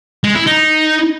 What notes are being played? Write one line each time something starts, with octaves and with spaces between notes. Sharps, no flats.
G#3
E4
D#4